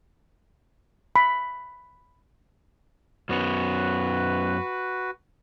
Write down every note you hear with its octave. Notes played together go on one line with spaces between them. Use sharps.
B5
F#2 B3 C#4 F#4 B4